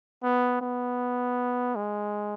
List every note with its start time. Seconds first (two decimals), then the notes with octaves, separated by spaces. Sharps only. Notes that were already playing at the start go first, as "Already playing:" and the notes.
0.23 B3
0.61 B3
1.75 G#3